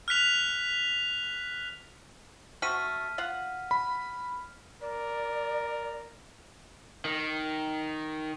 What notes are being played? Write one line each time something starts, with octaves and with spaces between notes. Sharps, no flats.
F6 F#6 B6 F7
A3 C4 F#4 F6 B6 D#7
F4 F5 F#5
B5
A#4 D5
D#3